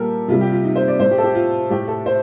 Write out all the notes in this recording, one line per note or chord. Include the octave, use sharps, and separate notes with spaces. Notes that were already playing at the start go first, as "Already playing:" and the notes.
Already playing: A#2 G3 G4 A4 A#4
C3 G3 F4
G4
F4
D#4
C5
D5
A2 A3 C5
G4
A4
G4
F4
A2 A3 G4
A4
C5